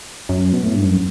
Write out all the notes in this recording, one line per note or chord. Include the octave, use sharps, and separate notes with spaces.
F#2
B2
A2
G2
F#2